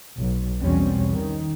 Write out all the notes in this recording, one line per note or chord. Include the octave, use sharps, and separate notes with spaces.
B1
E2 B2 G3 C4 C#4
D#3